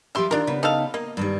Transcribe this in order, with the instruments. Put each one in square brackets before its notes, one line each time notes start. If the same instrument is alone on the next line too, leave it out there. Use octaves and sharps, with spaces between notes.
[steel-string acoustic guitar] F3 G4 A#4 [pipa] E5 C6
[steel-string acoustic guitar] D#3 F4 [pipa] D4 A#4
[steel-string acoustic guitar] C#3 B3
[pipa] D#4 A4 F5
[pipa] A#3 [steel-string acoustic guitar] D#5
[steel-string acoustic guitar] G2 D#3 G3